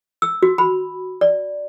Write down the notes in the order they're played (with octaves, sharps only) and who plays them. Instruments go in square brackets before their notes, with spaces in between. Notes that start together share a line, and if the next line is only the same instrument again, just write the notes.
[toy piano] E6
F#4
B5
D5